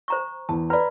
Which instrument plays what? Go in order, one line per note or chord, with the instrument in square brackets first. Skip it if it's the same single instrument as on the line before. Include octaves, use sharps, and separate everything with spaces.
[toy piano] C5 A#5 C#6
[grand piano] E2 [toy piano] A5
[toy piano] B4 D5 [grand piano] A#5 B5